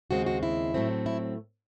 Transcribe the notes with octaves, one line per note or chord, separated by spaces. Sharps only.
D#2 C#3 G#3 C4 F#4
F#4
E4
A2 F#3 A3 C4
E4